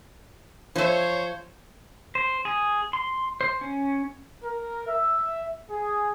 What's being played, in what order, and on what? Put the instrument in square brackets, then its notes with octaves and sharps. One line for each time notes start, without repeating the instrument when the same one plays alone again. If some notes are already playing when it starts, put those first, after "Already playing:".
[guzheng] F3 E5 [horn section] C5 C#5
[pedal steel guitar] C5
G#4
C6
C5
C#4
[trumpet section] A#4
E5
G#4